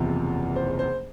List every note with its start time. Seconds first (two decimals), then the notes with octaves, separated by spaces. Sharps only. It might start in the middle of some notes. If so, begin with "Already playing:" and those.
Already playing: F#1 E2 C3 F3
0.56 C5
0.79 C5